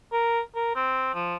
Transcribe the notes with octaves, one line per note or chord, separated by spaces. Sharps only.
A#4
A#4
C4
F3